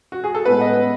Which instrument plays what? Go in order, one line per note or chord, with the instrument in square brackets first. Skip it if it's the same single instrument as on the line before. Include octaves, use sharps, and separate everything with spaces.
[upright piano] F#4
G#4
A4
[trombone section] A2 G#3 B3 [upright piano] B4
[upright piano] D#5